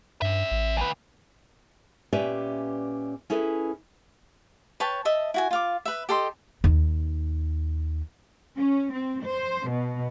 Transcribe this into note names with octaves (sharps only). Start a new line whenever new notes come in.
G2 C#4 E5
A1
D2 B4
A#2 C#4 G4 B4 D5 E5
C#4 E4 G#4 A4 B4
B4 C#5 G5 A5
D#5 E5 A5
E4 F#4 G#5
F4 F5 D6
B4 E5
G4 A4 D#5 C6
D#2 D#4
C#4
C4
C5
B2